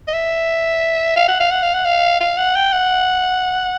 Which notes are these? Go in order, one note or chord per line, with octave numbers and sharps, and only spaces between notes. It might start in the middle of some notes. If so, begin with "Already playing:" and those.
D#5
E5
F5
F#5
F5
F#5
F5
F#5
F5
F5
F#5
G5
F#5